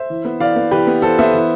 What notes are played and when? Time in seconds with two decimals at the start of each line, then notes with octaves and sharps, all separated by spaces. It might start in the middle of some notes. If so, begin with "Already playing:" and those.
Already playing: C5 E5
0.10 E3
0.25 B3
0.40 E3 D5 F5
0.56 B3
0.71 E3 G4 B4
0.87 B3
1.02 E3 A4 C5
1.18 B3 C5 E5
1.34 E3